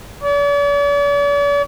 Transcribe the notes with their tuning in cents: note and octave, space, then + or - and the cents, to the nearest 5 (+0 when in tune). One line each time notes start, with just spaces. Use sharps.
D5 -45